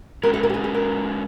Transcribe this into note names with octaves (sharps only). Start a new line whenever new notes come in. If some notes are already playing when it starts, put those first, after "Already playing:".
G#3 C#4 F#4 A#4 B4
A4
A#4
G4
G#4
G#4
A#4